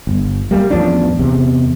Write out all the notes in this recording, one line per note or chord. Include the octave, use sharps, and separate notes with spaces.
G1
G3 A#3
A1 E2 F3 D4
E2 C3